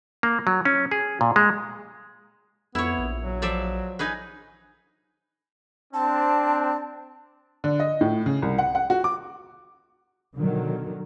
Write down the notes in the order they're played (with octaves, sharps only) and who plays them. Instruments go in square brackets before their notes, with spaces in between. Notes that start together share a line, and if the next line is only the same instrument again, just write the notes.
[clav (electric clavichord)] A#3
F#3
C#4
G#4
A#2
G#3
[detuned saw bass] F2 [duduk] B3 [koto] E4 C#5
[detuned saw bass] A#1
[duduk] F#3
[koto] F3 D5 E5
D#4 G#4 B4
[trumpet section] C4 D4 [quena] A5
[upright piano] D3
D#5
A2
C#3
C2
F#5
F#5
F#4
D6
[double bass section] B2 D3 D#3 F#3